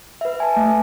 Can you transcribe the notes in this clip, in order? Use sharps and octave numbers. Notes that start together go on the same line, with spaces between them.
B4 E5
G#5 A5
A3